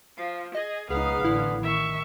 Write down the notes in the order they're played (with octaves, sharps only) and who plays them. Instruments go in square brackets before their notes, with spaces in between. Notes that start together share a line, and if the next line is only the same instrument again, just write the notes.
[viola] F3 [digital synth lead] F5
[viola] G#4 [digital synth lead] D#5
[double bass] C#2 D#4 [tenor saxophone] B3 [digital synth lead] G#4 [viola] F5
[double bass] A1 D3 [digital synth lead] E4
[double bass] D#3 [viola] E5 C#6